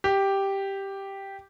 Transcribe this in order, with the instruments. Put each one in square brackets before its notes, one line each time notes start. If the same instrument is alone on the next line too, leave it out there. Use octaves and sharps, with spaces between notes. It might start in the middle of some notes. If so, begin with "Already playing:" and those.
[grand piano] G4